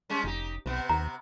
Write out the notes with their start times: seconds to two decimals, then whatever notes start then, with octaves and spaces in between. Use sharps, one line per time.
0.10 G3 G#3 C#4
0.24 F1 D#4 G4
0.66 B1 C3 B3
0.90 D#2 A#5